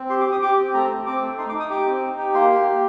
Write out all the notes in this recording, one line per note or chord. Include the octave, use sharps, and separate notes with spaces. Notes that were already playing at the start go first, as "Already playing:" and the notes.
Already playing: C4
G4 C6
D6
G4
D#6
G4 D6
C4
A3 A#5
C4
C4 D6
A3
D#4 C6
D6
D#4
D#6
G4 D6
C4
D#4
G4
A#3 C6
G4
G4